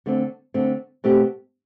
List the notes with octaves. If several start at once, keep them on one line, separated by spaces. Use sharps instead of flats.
D3 A3 C4
D3 A3 C4
B2 A3 C4 G4